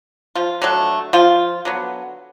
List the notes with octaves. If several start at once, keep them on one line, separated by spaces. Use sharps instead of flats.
F3 F4
D3 F#3 A3
F3 F4
D3 F#3 B3